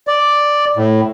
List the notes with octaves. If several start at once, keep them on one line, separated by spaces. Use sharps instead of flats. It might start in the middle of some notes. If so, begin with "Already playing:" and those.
D5
A2